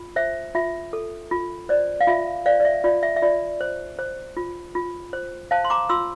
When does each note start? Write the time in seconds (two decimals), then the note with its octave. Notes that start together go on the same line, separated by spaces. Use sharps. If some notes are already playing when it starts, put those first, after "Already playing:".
Already playing: F4
0.16 C5 E5
0.55 F4 E5
0.93 A4
1.31 F4
1.69 C5 D5
2.01 F5
2.07 F4 E5
2.46 C5 D5 F5
2.60 D5
2.65 E5
2.84 F4 D5
3.03 E5
3.16 E5
3.22 F4 D5
3.61 C5
3.99 C5
4.37 F4
4.75 F4
5.13 C5
5.51 C5 F5 A5
5.65 C6
5.70 A#5 D6
5.89 F4 C6 E6